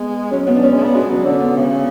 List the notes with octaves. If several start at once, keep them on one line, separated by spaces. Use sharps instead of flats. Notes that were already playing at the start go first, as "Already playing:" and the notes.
Already playing: G#3 B3
F#3 C#4
F#3 B3
D4
F#3 C#4
G#3
B3 D4
G#3 F#4
F#3 D4
D3 C#4
B3
C#3